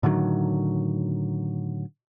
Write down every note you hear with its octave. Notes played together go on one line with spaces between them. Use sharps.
A2 D3 D#3 F#3